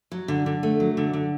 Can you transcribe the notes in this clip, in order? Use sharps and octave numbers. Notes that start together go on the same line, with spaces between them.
F#3
D3
D3
A3
F#3
D3
D3